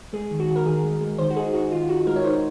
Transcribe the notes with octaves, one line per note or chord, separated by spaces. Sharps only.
G#3 G#4
D#3
F#4
D#3
A#4
D#3 G#4
G#3
G#3
D#3 C5
F#4
D#4 G#4
D#4 F#4
D#3 F4
D#4 F#4
G#3 A#4
C#5
D#4 C5